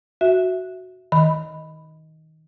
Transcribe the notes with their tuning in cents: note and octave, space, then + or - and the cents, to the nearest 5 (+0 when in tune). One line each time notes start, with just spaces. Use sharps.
F#4 +0 E5 +0
D#3 +20 B5 +0